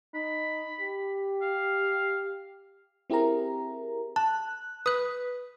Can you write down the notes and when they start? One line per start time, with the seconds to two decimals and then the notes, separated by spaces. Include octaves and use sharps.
0.15 D#4 B5
0.81 G4
1.42 F5
3.10 C4 E4 G4 G#4 A#4 A#5
4.16 A5 F#6
4.86 B4 D#6 F#6